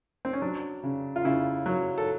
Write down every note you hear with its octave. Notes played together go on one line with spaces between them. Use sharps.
C4
C#4
F#3 D4
C#3
F4
C#3 E4
F#3
A4